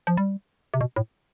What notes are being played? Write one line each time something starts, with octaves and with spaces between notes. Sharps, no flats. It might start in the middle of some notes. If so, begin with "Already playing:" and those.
F3
G3
C3
B2
A2